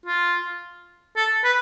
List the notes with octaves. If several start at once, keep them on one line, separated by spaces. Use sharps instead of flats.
F4
A4
B4